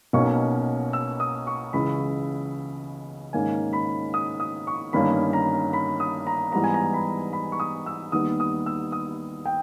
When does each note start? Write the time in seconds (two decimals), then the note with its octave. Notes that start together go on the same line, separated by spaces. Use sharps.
0.13 B1 B2 A#3 C#4 C#6
0.93 E6
1.20 D#6
1.47 C#6
1.73 C#2 C#3 E3 B5
3.33 G#2 D#3 A#3 C#4 G#5
3.73 B5
4.14 D#6
4.40 D#6
4.67 C#6
4.93 G1 G2 D#3 A#3 C#4 B5
5.33 A#5
5.73 B5
6.00 D#6
6.27 A#5
6.52 G#2 E3 G3 B3 A#5
6.64 G#5
6.74 A#5
6.93 B5
7.33 B5
7.52 C#6
7.59 D#6
7.86 E6
8.12 D#2 D#3 G3 B3 D#6
8.40 D#6
8.66 E6
8.92 D#6
9.46 G5